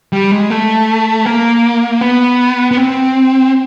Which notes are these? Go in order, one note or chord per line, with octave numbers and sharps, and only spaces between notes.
G3
G#3
A3
A#3
B3
B3
C4